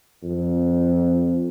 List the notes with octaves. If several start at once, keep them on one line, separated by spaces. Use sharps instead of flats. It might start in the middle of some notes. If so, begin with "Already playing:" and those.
F2